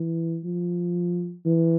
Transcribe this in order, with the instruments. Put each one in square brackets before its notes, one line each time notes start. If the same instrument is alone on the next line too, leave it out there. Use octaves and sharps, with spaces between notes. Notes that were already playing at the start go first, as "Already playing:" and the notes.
Already playing: [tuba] E3
F3
E3